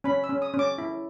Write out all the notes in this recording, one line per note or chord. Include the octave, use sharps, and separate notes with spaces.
C#4 B5
E6
C#4
D#6
C#4
D6
E4